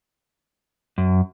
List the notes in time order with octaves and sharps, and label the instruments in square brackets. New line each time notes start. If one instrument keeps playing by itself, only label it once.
[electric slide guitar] F#2